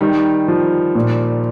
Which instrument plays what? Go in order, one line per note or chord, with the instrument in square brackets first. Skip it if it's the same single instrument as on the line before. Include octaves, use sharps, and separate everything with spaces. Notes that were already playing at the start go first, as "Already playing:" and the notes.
[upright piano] D#3 G3 [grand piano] D#4
[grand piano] F3
A#2